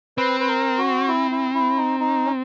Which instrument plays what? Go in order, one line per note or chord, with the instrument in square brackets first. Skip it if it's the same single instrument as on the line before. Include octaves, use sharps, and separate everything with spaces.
[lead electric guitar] C4 [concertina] B4
[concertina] B4
A#4
F#4
E4
E4
E4
D#4
D#4
C#4